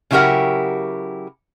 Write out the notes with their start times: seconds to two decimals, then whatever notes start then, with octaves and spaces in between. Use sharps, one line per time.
0.11 C#3 F#3 E4 G4 A#4 F#5